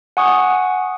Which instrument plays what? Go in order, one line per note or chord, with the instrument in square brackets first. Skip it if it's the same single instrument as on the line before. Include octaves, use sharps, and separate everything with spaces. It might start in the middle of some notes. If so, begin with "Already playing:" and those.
[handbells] F#5 G#5 C#6 D#6